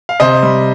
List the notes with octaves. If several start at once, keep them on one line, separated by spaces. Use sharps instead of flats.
F5
C3 C5 D#5
G3